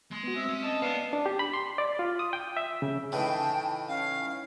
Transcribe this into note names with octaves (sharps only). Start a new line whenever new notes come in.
G#3 C6
B3 F#4
C4 E5
C#4
C#4 D#5 A5
B3 D4 B4 F5
D4
G4
B5
C6
D5
F4
D#6
G5
E5
C#3
A2 C#3 E3 D#4 E4 G5 A5
C#4 F5